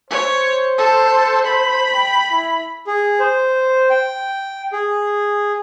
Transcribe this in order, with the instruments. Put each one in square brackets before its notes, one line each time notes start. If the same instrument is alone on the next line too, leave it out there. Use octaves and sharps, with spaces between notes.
[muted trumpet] C5 [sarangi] C#5
[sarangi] A4
B5
[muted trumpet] G5
E4
[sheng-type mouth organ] G#4
C5
G5
G#4